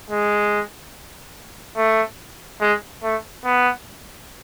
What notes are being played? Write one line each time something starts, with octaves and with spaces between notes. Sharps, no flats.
G#3
A3
G#3
A3
B3